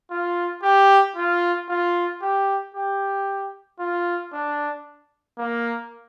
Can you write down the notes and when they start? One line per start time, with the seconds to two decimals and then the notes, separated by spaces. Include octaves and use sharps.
0.11 F4
0.63 G4
1.16 F4
1.69 F4
2.22 G4
2.75 G4
3.79 F4
4.33 D4
5.38 A#3